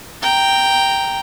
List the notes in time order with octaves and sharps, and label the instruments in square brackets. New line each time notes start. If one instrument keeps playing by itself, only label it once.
[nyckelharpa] G5 A#5